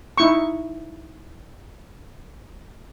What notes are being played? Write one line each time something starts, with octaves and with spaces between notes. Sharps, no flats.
D#4 E4 C#6